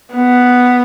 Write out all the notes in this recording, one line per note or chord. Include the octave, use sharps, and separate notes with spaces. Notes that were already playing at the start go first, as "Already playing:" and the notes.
B3